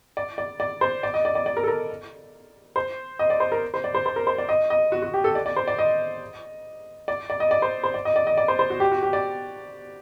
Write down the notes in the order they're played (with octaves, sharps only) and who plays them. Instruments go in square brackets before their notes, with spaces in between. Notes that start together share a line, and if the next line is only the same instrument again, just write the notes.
[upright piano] D5
D5
D5
C5
D5
D#5
D5
D5
D5
A#4
A4
A#4
C5
D#5
D5
C5
A#4
C5
D5
C5
C5
A#4
C5
D5
D#5
D#5
F#4
F#4
G4
A4
D5
D5
C5
D5
D#5
D5
D5
D#5
D5
C5
C5
D5
D#5
D5
D#5
D5
C5
C5
F#4
G4
F#4
G4
D5